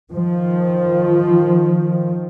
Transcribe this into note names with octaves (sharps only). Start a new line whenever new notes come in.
D#3 F3